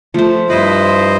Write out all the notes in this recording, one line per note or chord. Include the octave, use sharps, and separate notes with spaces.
F3 A3 C5
G2 E4 B4 C5 D#5